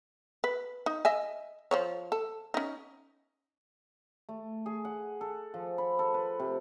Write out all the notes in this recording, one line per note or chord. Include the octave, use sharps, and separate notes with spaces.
B4
D#4
D#5 E5 G#5
F3 C5 C#5
A4
C#4 D#4
A3
G#4
F#5
A4
F3
B5
A4
B4
C3